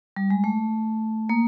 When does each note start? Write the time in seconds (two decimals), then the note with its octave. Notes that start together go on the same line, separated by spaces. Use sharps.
0.16 G3
0.30 G#3
0.44 A3
1.29 A#3